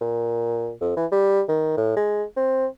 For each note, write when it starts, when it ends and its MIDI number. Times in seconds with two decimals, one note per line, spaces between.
0.01 0.72 46
0.81 0.92 41
0.97 1.06 52
1.12 1.42 55
1.49 1.75 51
1.77 1.92 45
1.96 2.24 56
2.36 2.67 60